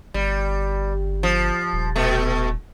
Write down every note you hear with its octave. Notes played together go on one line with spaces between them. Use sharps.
G1 G3
F3
D#1
B2 A3